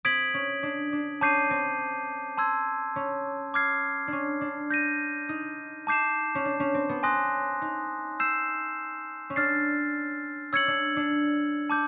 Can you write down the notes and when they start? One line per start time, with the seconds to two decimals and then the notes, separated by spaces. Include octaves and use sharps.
0.05 C4 D#6 G#6 B6 D7 F#7
0.34 C#4
0.63 D4
0.93 D4
1.21 C#4 A5 D6 G6 C7 D#7
1.50 C4
2.37 A5 C6 E6 G#6
2.96 C#4
3.54 D6 F6 G#6 C7
4.08 C#4 D4
4.41 D4
4.70 G6 A#6 D#7
5.29 D#4
5.87 A5 D6 G6 C7 E7
6.35 C#4
6.45 D4
6.60 C#4
6.74 C4
6.89 B3
7.03 C4 G#5 C6 D#6 F#6 A#6
7.62 D#4
8.20 E6 G6 C7 E7
9.30 C#4
9.36 D4 F6 A6 C7
10.53 C#4 E6 G#6 C#7 F#7
10.68 D4
10.96 D4
11.70 A5 D6 G6